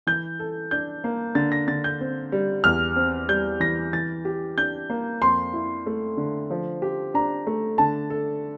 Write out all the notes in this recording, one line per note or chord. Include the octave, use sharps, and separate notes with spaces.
E3 G6
A4
D4 G6
A#3
D3 A6
A#6
D3 A6
G6
C4
G3
E2 F6
C4
G3 G6
E3 A#6
E3 A6
G4
D4 G6
A#3
F2 C6
E4
A3
D3
F3
G4
D4 A#5
A3
D3 A5
A4